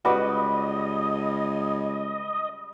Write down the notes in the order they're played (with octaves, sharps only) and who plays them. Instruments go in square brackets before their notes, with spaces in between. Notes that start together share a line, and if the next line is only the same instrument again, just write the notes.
[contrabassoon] C#2 [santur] G3 D6 [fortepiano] F#4 B4 [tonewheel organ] D#5